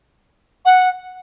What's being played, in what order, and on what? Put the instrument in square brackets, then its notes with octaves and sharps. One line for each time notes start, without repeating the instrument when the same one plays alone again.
[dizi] F#5